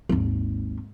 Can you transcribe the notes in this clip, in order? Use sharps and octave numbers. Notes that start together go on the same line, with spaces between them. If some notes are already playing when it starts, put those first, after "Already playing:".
G#1 D#2